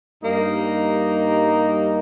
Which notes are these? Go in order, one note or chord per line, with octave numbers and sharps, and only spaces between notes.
G2 G3 A#3 D#4